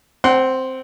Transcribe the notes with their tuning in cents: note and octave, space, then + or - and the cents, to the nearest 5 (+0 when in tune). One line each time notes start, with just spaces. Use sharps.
C4 +0 F#5 +35 C6 +0